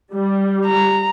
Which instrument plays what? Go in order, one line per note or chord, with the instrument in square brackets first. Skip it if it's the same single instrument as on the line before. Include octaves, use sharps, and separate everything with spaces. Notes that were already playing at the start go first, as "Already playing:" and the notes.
[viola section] G3
[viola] A#5